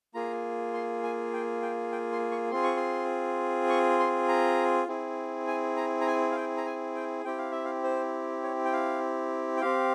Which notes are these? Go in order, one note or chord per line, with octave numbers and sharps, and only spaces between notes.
A#3 F4 G#4 A#5
C6
G#5
G5
G5
G5
C6
C#6
C4 F4 G#4 C6
C#6
C6
C#6
C6
A#5
C4 E4 G#4
G#5
A#5
A#5
G#5
F5
G5
A#5
G#5
G5
C4 E4 G4 G5
F5
E5
F5
C5
C#5
G5
F5
G5
C4 G4 F5